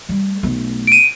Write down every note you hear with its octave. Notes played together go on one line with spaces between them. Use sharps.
G3 A3
B1 A3
D7 D#7